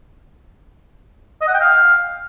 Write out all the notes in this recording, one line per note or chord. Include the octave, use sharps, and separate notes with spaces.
D#5
F#5
G5
F5